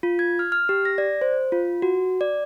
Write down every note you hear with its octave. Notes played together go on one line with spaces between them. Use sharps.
F4
G#6
F6
F6
G4
A#6
D5
C5
F4
F#4
D5